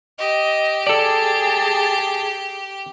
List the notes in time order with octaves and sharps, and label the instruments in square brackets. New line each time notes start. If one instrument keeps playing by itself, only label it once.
[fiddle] G4 [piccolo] D#5
[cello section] G#4 [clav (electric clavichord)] A4 D5 [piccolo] A5